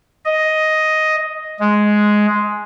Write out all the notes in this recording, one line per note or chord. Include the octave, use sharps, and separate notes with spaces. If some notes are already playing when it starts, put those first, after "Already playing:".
D#5
G#3